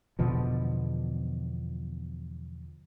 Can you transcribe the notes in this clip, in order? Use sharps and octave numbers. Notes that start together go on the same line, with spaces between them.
E2 B2 D3 F3